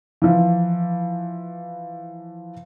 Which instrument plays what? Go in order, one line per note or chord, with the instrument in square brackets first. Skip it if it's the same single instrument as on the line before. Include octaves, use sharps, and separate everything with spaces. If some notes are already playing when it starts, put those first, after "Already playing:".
[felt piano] E3 F3